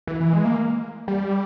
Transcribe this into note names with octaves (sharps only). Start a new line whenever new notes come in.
E3
E3
G#3
A#3
G3